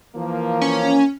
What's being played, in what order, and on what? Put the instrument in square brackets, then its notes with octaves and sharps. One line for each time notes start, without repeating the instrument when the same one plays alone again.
[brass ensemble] E3 F3 A#3
[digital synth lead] C#4